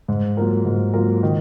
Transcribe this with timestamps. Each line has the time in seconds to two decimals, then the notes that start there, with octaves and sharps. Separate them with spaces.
0.08 G#2
0.37 F#3 A#3 F4 A#4
0.66 G#2
0.94 F#3 A#3 F4 A#4
1.23 D#3